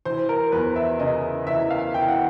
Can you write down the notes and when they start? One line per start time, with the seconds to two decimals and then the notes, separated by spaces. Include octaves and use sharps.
0.05 E3 C5
0.29 A#4
0.52 E2 B4
0.76 E5
0.99 C#3 D#5
1.47 E3 E5
1.70 F5
1.94 E3 G5
2.08 F#5